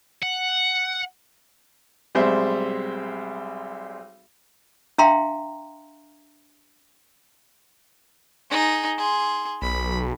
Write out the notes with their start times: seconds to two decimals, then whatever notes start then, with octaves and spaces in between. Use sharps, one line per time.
0.23 F#5
2.15 B1 G3 G#3 C4 C5 E5
4.98 D4 E5 F5 G5 A#5 C6
8.51 D#4 G#4
8.98 G#4 C6
9.62 B1 B5